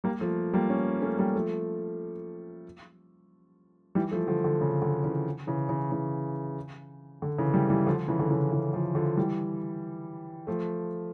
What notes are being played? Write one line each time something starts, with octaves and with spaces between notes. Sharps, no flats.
G3 A#3
F3 A3
G3 A#3
A3 C#4
A3 C#4
G3 A#3
F3 A3
E3 G3
F3 A3
D3 F3
D3
C#3
D3
C#3 E3
C#3 E3
C#3 E3
C#3 E3
D3
C#3 E3
E3 G3
E3 G3
D3 F3
C#3 E3
D3
C#3 E3
C#3 E3
D3 F3
D3 F3
E3 G3
F3 A3